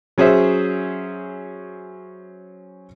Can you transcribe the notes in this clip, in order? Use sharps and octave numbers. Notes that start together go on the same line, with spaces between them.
F#3 C#4 G#4 C5 E5